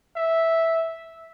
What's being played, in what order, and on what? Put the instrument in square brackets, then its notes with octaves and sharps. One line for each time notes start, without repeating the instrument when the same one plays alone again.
[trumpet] E5